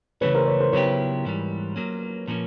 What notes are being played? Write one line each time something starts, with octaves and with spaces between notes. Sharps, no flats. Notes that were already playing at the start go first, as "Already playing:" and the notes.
C#3 E3 A3 C#4 B4 C#5
A#4 C5
B4 C#5
A#4 C5
C#3 F#3 B3 E4 G4 B4 C#5
G#2 E3 G3
F#3 A#3 C#4
A#2 F3 A#3 C#4